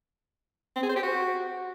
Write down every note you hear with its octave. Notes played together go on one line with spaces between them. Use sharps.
C4
G#4
C5
G4
F#4